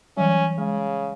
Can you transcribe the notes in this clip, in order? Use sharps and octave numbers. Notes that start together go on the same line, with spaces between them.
E3 F#3 G3 C#4
C#3 G#3